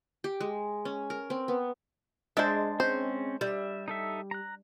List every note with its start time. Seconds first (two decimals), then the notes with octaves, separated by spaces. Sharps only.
0.24 G4
0.40 G#3
0.85 C#4
1.10 A#4
1.30 C4
1.48 B3
2.37 G#3 D4 C5 E5
2.80 C4 C#4 C5
3.41 G3 E5
3.88 D#4 A4 E5
4.31 A#5 F#6